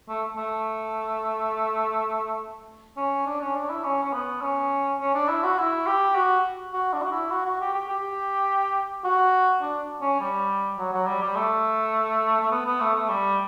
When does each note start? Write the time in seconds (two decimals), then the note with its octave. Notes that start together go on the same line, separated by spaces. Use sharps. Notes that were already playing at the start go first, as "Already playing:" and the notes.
0.08 A3
0.37 A3
2.97 C#4
3.26 D4
3.41 C#4
3.55 D4
3.69 E4
3.84 C#4
4.03 C#4
4.13 B3
4.42 C#4
5.00 C#4
5.14 D4
5.29 E4
5.43 F#4
5.58 E4
5.87 G4
6.15 F#4
6.73 F#4
6.93 D4
7.02 F#4
7.11 E4
7.31 F#4
7.46 F#4
7.61 G4
7.74 G4
7.89 G4
9.04 F#4
9.62 D4
10.01 C#4
10.20 G3
10.78 F#3
10.93 F#3
11.07 G3
11.22 G3
11.36 A3
12.40 A3
12.51 B3
12.66 B3
12.81 A3
12.95 A3
13.09 G3